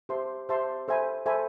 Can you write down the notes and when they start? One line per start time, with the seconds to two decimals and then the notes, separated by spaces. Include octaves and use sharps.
0.09 G4 C5 E5 A5 C6
0.49 G4 C5 E5 A5 C6
0.88 A4 C5 E5 G#5 B5
1.26 A4 C5 E5 G#5 B5